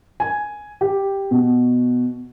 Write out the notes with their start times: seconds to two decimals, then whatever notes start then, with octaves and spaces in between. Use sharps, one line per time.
0.20 G#5
0.81 G4
1.31 B2